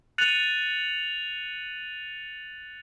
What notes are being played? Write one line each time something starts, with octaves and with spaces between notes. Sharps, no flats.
F#6 A6 C#7 D#7 F7 F#7